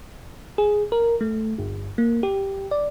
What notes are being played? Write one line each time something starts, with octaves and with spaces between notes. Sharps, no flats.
G#4
A#4
A3
G1
A#3
G4
D5